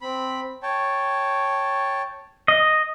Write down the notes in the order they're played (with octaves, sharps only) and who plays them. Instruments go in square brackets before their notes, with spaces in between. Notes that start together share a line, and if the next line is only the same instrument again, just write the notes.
[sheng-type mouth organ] C4 B5
C#5 G5 A5
[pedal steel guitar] D#5